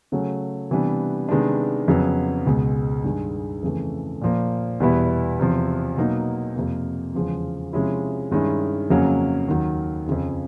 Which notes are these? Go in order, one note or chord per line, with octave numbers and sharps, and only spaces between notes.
C#3 F#3 A3 C#4
C3 E3 G3 B3 D4
C3 D#3 G#3 B3 D4
F2 C#3 F#3 B3
C#2 B2 G#3
G2 D#3 G#3
F2 C#3 E3 A3
A#2 F3 A#3
E2 B2 G3 B3 E4
E2 C3 F3
B2 F#3 A#3 D#4
F2 C3 F3 A#3
E2 C#3 F3 G#3
C3 F3 G#3 C#4 E4
G2 D#3 G#3 C#4 E4
F2 C#3 F#3 A#3 C#4
D#2 D#3 F#3
F2 C#3 F3